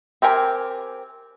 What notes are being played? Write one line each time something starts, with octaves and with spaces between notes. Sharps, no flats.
C4 G4 A#4 G#5